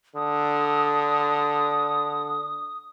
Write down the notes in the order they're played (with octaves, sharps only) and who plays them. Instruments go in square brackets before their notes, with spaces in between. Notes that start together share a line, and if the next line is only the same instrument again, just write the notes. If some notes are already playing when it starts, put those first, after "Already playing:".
[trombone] D3 [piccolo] D#6